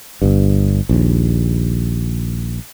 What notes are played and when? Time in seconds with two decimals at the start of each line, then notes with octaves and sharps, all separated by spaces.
0.22 G1 G2
0.89 A#1 D#2